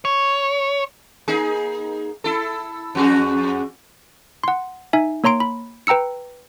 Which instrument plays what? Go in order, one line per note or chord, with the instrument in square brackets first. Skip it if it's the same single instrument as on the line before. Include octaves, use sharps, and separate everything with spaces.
[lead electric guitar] C#5
[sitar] A#3 D#4 G#4
E4 A4
F2 F#4 G#4
[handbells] F#5 C6
D#4 E5 G#5
A#3 C#5 A#5 C6 D7
B5
B4 G5 A#5 E6 C#7